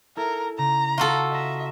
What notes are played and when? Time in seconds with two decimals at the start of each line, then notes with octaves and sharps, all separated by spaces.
0.17 E4 A4 A#4 E5
0.58 C#3 A#5
0.98 F4 F#4 A4
1.32 D#5 E5 A#5